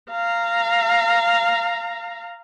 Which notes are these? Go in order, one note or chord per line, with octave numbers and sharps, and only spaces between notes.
F5 A#5